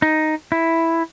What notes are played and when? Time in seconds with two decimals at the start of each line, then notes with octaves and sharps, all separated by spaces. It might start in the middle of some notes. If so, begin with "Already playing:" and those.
0.02 D#4
0.52 E4